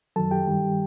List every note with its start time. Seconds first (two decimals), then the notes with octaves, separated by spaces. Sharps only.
0.16 F#2 D#3 F#3 A4 A5
0.31 G4 G5
0.47 G2 D#3 G3